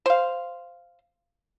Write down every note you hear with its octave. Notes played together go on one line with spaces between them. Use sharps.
C5 F5